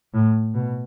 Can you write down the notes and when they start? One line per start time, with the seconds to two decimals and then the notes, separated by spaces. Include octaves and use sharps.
0.14 A2
0.54 B2